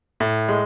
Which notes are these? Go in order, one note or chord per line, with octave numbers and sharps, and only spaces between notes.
A2
G#3